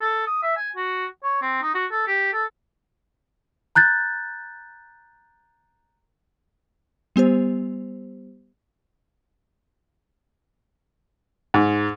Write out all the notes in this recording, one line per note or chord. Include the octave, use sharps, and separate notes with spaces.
A4
D#6
E5
G#5
F#4
C#5
C4
D#4
F#4
A4
G4
A4
A#5 F#6 G6 A6
G3 B3 G4 C5
G#2